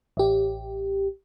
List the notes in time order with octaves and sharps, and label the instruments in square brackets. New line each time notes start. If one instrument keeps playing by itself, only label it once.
[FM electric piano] A1 G4